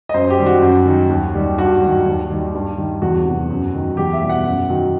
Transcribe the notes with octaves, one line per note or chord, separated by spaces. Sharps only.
D#5
F#2 C5
G4
D#3 G3
F#4
F#2
D#3 F#3
D#2
D#3 G3
G2 F#4
D#3 F#3
D#2
D#3 G3
G2
D#3 G3
E2 F#4
C3 F#3
F#2
D#3 F#3
E2 G4
E5
B2 G3
F#5
F#2
D#3 F#3